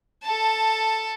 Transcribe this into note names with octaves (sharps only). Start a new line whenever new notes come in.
A4 A5